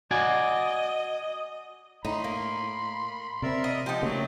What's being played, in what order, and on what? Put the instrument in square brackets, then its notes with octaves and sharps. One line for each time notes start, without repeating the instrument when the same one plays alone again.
[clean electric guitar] F#4 D5 G#5 [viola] D#5
[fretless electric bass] A2 [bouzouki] D#4 [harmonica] B5 C6
[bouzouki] A#3
[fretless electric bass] C3 C4 [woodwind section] A#4 D5 E5
[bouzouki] D#5
[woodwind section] F3 G#3 B3 [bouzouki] D#4 G4
[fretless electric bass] C#3 A#3 [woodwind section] F#3 A3